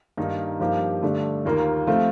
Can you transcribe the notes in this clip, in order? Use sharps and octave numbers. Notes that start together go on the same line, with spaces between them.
G2 D#3 A#3 D#4
G2 F3 A#3 D#4 G4
G2 D3 A3 D4
D#2 D#3 A#3 F4 A#4
F3 A3 C4 F4